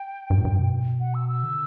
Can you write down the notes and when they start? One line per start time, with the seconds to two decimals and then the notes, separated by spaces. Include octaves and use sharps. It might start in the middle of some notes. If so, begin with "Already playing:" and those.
Already playing: G5
0.30 G2
0.38 A2
0.45 G2
0.59 B2
1.00 F#5
1.14 E6
1.29 E6
1.43 D3